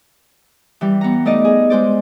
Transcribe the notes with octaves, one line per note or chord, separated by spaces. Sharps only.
E3 G3
B3 F#5 A#5
A3 D#4 D5 D#5
G#4
G#3 C5 D5